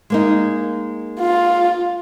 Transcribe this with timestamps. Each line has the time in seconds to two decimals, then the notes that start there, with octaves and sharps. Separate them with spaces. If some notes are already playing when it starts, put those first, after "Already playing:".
0.10 G#3 A#3 D#4
1.20 F4